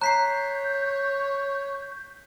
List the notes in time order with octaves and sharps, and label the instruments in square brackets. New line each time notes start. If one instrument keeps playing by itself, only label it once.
[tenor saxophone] C#5 [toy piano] A#5 [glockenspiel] F#6 B6 C7 [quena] G6